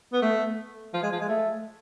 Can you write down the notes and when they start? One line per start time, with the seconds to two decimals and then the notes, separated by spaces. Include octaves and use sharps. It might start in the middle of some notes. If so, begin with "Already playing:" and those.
0.13 B3
0.22 A3
0.94 F3
1.03 G#3
1.12 F3
1.20 G#3
1.28 A3